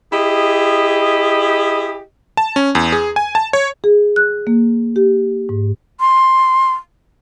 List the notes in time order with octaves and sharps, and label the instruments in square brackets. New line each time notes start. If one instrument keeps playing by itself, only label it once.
[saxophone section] E4 G4 G#4 D#5
[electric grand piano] A5
C#4
E2
G#4
G#5
A5
C#5
[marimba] G#4
F#6
A#3
G4
G#2
[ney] C6